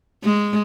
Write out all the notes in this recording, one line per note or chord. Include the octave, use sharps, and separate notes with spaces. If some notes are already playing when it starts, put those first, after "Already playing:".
G#3